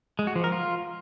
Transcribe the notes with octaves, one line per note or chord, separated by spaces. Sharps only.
G#3
F#4
F3
A#4
F4